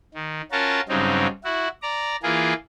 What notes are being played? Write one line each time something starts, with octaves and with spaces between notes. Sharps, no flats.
D#3
C#4 F4 F#4 A#4 A5
G2 C#3 F#3 C4 D#4
E4 F#4
D5 A#5
E3 A#3 F4 G#4